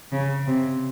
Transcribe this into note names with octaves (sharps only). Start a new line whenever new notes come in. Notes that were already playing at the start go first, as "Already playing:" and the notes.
C#3
C3